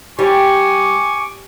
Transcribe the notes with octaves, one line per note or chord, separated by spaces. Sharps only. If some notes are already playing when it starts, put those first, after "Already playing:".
G3 G#5 C#6 D6